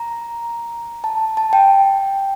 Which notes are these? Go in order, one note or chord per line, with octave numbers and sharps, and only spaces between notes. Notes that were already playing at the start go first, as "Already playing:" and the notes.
Already playing: A#5
A5
A5
G5